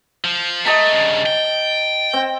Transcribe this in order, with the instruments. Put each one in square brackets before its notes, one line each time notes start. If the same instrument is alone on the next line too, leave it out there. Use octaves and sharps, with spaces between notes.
[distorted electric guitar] F3
[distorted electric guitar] A3 [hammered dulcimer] D#5 A5 A#5
[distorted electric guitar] G2 C#3
G5
[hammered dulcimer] C4